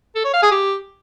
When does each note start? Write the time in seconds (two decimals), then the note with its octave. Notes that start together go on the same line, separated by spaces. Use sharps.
0.15 A4
0.24 C#5
0.33 F5
0.42 G#4
0.51 G4